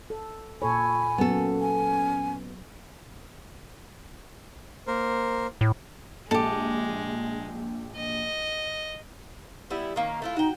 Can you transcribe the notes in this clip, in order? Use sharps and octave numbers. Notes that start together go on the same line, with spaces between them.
A4
A#2 A4 C#5 G#5 B5
F#3 A#3 B3 C#4 A4
G#5
A#3 A#4 C5
A2
A#1 G#3 G4 A4
D#5
G3 B3 E4
D#3 A#3 C#4
A3 E4 F4
D#4 F#4 G5